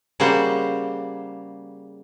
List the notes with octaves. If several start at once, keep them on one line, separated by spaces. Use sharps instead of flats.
C#3 G3 A#3 F#4 C5